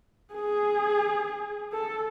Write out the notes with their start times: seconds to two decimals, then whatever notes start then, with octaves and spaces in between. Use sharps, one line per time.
0.34 G#4
1.73 A4